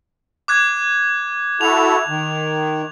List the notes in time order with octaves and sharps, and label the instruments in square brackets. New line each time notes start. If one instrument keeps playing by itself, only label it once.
[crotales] D6 F#6 G#6
[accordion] E4 F#4 A4 [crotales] F7
[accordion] D#3